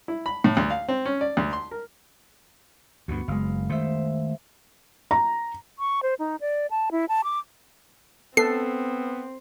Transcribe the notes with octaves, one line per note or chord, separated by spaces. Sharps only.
E4
B5
A2
D2
F5
C4
C#4
D5
D2
C6
A#4
D2 G2 B3 F#4
F#1 G#3 F5
D#3 A3 C5 E5
A#5
C#6
C5
D#4
D5
A5
E4
A5
D6
B3 C4 A4 C7